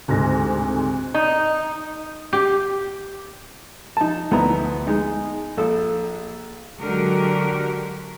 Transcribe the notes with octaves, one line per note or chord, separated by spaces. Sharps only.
D2 G#2 C3 A#6
D#4
G4
D#4 A5
D2 B3 E4 A#5
G#3 D#4
A#1 A4
D3 F#3 G#3 F#4 G4 A#4